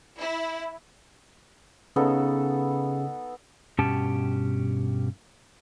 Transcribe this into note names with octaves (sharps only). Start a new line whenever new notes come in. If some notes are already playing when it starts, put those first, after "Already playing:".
E4
C#3 B3 D#4 A4
G2 B2 C#4 G4 A5